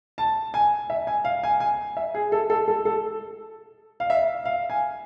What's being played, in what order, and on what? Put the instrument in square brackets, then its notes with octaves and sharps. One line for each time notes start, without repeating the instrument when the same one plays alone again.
[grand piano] A5
G#5
E5
G#5
F5
G#5
G#5
E5
G#4
A4
A4
A4
A4
F5
E5
F5
G#5